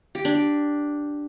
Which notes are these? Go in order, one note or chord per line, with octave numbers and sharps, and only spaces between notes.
G4
D4
G4